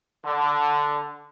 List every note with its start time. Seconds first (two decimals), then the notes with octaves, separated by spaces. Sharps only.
0.25 D3